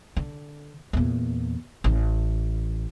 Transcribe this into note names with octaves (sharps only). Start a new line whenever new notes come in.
D3
E2 A#2
A1